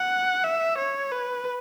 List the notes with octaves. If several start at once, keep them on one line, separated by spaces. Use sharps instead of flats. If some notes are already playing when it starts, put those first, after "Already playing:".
Already playing: F#5
E5
C#5
B4